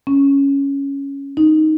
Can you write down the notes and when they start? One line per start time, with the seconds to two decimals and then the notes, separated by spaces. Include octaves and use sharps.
0.07 C#4
1.37 D#4